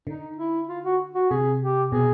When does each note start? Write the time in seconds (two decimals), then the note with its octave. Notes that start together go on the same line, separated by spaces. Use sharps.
0.07 D3 D#4
0.38 E4
0.69 F4
0.85 F#4
1.15 F#4
1.30 C3 G#4
1.61 G4
1.92 B2 G#4